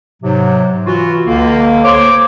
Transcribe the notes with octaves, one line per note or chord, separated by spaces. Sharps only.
G#2 C3 F#3
E3 F4 F#4
C#2 D3 A#3
C5 C#5 D6